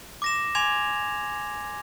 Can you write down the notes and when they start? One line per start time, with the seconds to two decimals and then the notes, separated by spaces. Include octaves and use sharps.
0.22 D6 A#6 E7
0.55 G#5 C6 D6 G#6 F7